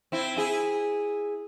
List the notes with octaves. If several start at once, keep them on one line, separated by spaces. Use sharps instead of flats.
C4 E4
E4 G#4